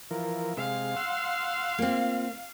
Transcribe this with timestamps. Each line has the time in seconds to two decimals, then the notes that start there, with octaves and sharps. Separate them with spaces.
0.11 E3 F3 A#4
0.57 C3 G#3 F5
0.96 F#5 C6 E6
1.78 A#3 C4 F4